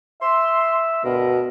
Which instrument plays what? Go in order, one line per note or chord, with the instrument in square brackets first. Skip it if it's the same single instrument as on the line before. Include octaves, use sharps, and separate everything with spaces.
[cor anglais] E5 [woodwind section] C6
[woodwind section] D2 G2 A#4 [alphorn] B2 [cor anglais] B3